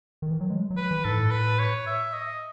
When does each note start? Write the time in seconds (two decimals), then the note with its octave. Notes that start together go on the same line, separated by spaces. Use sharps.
0.22 D#3
0.31 E3
0.40 F#3
0.50 G#3
0.70 F#3
0.77 B4
0.91 E3
1.05 G#2 A4
1.12 A2
1.31 B4
1.59 C#5
1.86 E5
2.13 D#5